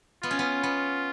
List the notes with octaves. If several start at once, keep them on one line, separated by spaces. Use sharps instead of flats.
B3 F4
C#4
B3
B3